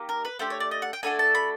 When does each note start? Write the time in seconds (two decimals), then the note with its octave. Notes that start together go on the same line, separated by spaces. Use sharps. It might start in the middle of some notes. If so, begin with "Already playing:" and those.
Already playing: A#3 D#4 G4
0.09 A#4
0.25 B4
0.39 A3 D4 G4 C5
0.50 C#5
0.60 D5
0.71 D#5
0.82 F#5
0.93 G5
1.03 A3 D4 F#4 A4 G#5
1.19 A5
1.35 B5